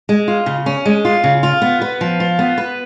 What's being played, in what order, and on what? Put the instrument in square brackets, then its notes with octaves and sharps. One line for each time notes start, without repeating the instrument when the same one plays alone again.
[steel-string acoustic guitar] G#3
F4
C#3
C#4
G#3
F4
C#3
F4
B3
B4
F3
F4
B3
B4